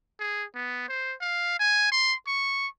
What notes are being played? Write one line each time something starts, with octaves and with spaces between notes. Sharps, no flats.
G#4
B3
C5
F5
G#5
C6
C#6